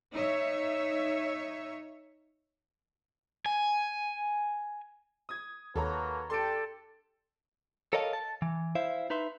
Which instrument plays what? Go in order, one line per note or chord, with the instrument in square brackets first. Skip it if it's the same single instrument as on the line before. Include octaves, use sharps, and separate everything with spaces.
[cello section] D#4 C#5 E5
[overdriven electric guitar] G#5
[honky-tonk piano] D#6 G#6
[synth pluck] D#2 [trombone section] A#3 F#4 B4 [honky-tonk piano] A4 C#5 A#5
[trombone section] D4 G4 [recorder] A4 [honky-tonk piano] C6 D7
[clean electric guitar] A4 A#4 C#5 D#5 F5 A5
A5
E3
E4 C5 E5 F5
D#4 B4 E5 C6